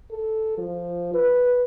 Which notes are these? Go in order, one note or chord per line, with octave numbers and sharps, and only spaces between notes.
A4
F3
B4